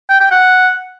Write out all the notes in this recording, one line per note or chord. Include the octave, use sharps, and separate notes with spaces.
G5
G5
F#5